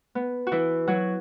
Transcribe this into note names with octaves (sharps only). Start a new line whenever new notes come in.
B3
F#4
E3 E4
F#3 F#4